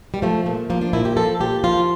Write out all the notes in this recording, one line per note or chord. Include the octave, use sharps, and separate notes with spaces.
G3
F3 A3
A#2 A3
F3 A#3
D4
A#2 E4
G4
F3 A4
A#2 G4
F3 F4